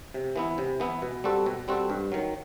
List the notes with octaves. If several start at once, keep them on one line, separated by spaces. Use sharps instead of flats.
C3
E3 B3 E4
C3
E3 B3 E4
B2
G3 C4 F#4 A4
B2
G3 C4 F#4 A4
G2
D#3 F#3